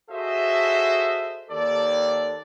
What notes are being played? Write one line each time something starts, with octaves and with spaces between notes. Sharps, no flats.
F#4 G#4 A4 C5 D#5 E5
D#2 G4 A4 D5